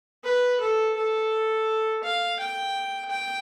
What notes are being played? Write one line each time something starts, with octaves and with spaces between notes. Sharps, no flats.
B4
A4
A4
F5
G5
G5